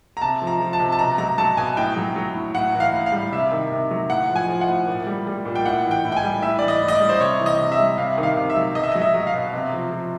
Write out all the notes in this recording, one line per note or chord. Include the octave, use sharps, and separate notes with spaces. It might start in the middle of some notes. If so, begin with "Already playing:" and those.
A#5
C3 A5
F3
A#5
F3
A5
C3
A5
B2 A#5
F#3 A#5
F#3 A5
B2 G#5
A2 G5
F#3
F#3
A2
A2 F#5
E3
F5
A2
F5
G3
C3 E5
D#3
C3
F#3
A2 F#5
F3
G#5
F3
F#5
A2
A#2
G3
G3
A#2
G5
A2 F#5
E3
G5
A2
G5
G#5
G3
A2 E5
E3 D5
D#5
A2
D#5
D5
G3
C5
C3 C#5
E3
D#5
C3
E5
G3
C3 F5
D#3
F5
C3
E5
F#3
B2 D#5
E5
D#5
F#3
E5
F#3
F5
B2
C3
F3
F3